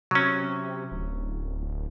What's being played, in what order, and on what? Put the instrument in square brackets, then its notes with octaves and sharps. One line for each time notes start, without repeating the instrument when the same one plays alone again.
[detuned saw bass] C3 [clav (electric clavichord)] F#3 C#4
[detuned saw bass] D1